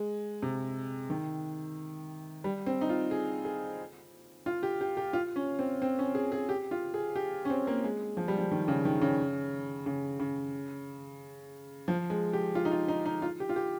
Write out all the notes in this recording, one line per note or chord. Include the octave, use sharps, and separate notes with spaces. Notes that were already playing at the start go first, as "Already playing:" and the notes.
Already playing: G#3
C3
D#3
G3
C4
D#4
F4
G#4
G#4
F4
G4
G4
G4
F4
C#4
C4
C4
C#4
G#4
G#4
G4
F4
G#4
G4
C#4
C4
A#3
G#3
F3
G3
F3
D#3
C#3
D#3
C#3
C#3
C#3
F3
G#3
G4
F4
D#4
F4
D#4
D#4
F4
G4
F4
G4